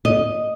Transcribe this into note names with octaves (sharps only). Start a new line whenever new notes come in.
D#5